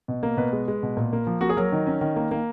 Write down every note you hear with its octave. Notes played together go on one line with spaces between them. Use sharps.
B2
A#3
B2 B4
G#3
G#3
B2
A#2
A#3
F3
A#3 F#4
G#4
F#3 A#4
D#3
C#4
D#3
A#3
A#3